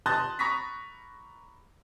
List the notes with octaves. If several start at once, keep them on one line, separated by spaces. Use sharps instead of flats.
A5 C6 D#6 F#6 G6 A6
A#5 B5 C#6 D#6 A#6 B6